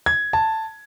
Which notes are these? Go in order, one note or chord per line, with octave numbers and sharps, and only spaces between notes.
G#6
A5